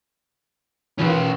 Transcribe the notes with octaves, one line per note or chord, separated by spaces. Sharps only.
D#3 E3 C#4 F4 B4